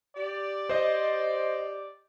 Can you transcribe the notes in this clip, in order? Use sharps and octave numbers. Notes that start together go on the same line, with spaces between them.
G4 D5
C5 D#5